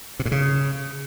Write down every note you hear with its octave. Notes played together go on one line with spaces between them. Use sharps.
C3
A2
C#3